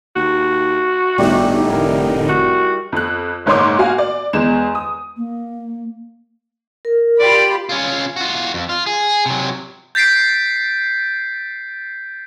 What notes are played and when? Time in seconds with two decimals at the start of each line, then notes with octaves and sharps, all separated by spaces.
0.16 D#2 F#4
1.18 G1 A2 D3 G3 D#4 D5 E5
1.68 F1 E4 A#4
2.29 F#4
2.92 F2 F#6
3.46 F#1 G#2 C#5 C6 D6
3.79 F#4 F5 G#5
3.98 D5
4.33 E2 G#3 E7
4.75 D#6
5.17 A#3
6.85 A#4
7.19 F4 G4 D5 B5
7.69 C#4 F4
8.16 F4 F#4
8.54 F2
8.69 F4
8.86 G#4
9.26 C3 F#3
9.95 G6 A6 B6 C7 D7